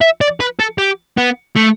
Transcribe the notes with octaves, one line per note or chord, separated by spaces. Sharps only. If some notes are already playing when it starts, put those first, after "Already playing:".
E5
D5
B4
A4
G4
B3
A3